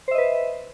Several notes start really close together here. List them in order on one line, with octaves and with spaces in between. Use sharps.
C5 E5 D#5 B4